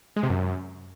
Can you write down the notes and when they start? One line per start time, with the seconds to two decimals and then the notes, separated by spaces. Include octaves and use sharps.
0.16 G#3
0.23 C3
0.30 F#2